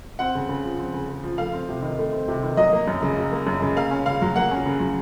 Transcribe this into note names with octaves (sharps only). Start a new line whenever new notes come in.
C4 F#5
C#3
C#3
F3
C4
C#3
C#3
F3
A3 F5
C4
C3
D#3
A3
C4
C3
D#3
F#3 D#5
A#3
F#2
C#3
F#3
A#3
F#2
C#3
A#3 F5
C#4
C#3 F5
F#3
A#3 F#5
C#4
C#3
F#3